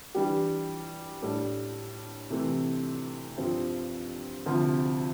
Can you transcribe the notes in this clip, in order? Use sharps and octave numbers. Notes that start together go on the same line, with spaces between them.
E3 G3 D4 G4
A2 G3 D4 A4
C3 E3 A3
G2 F3 C4 F4
D2 C3 F3